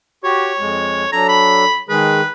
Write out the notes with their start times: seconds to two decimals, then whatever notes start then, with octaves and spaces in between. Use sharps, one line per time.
0.24 F#4 G4 C#5
0.59 F2 G#3
1.12 F#3 D4 A4 A#5
1.29 B5
1.89 D#3 G#3 G#4 B4